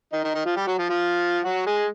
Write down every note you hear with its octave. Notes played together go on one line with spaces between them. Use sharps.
D#3 D#4
D#3 D#4
D#3 D#4
F3 F4
G3 G4
F#3 F#4
F3 F4
F3 F4
F#3 F#4
G#3 G#4